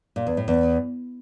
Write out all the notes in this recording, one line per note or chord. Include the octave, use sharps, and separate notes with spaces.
A#2
E2
A2
E2